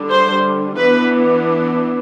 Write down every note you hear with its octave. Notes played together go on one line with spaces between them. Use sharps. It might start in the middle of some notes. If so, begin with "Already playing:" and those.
Already playing: D3 G3 D4
C5
E3 B3 D4 B4